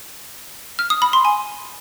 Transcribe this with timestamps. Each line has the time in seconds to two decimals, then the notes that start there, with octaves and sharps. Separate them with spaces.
0.79 F6
0.90 D#6
1.02 B5
1.13 C6
1.25 G#5